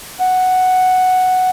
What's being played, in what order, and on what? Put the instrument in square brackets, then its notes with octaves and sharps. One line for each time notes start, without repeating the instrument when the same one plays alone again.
[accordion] F#5